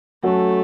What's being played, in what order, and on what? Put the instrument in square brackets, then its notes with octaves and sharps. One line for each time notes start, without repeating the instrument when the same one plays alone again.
[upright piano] F#3 C#4 F#4 A4 [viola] A3